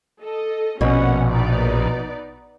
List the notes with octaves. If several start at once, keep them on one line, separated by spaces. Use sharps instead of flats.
A4 D#5
A#1 B2 C#4 F#5
D#4 B4 D5